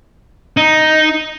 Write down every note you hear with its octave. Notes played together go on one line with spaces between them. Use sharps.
D#4